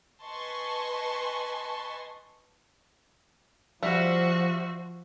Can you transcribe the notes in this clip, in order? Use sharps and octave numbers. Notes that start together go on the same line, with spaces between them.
B4 D#5 G#5 A5 C6 C#6
F3 G3 F#4 C5 E5 F5